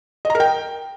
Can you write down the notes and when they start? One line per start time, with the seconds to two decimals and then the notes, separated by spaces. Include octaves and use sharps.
0.25 D#5
0.30 A#5
0.35 A#4
0.40 G5